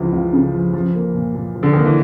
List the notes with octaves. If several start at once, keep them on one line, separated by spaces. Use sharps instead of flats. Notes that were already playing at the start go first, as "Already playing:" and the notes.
Already playing: C#2 C#3 E3 F3
C#2
C#3
F3
F3
A#3
A#2
A#2
F3
D3
D#3 A#3
E3